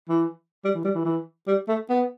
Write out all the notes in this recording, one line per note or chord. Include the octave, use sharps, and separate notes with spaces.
E3
G3
E3
G3
E3
E3
G3
A3
B3